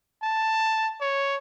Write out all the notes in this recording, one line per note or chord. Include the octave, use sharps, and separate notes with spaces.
A5
C#5